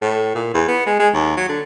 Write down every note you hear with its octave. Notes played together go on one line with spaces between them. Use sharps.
A2
A#2
E2
B3
G#3
G#3
D#2
F#3
D3